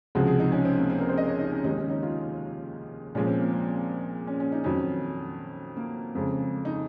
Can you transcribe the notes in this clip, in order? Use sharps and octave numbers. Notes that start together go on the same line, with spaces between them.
C#2 C3 F3 G#3 F#4
G#4
D#4
C#4
C4
A#3
C4
A#4
C5
D#5
C#5
D#4
C#4
D#2 D#3 G#3 D#4
C#4
D#4
F4
A#2 F3 G#3 C#4
C4
A#3
C4
C#4
C#4
D#4
F2 D#3 F#3 C#4
A#3
F2 C#3 G#3
D#4